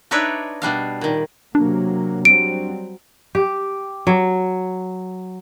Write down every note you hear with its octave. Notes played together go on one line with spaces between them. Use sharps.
D4 D#4 B4 C#5 D5 E5
B2 G3 D4 F5
A#2 D#3
C3 F#3 A#3 D4
F#3 G3 C4 D7
G4
F#3